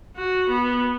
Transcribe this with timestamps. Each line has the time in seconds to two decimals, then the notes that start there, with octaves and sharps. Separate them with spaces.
0.16 F#4
0.50 B3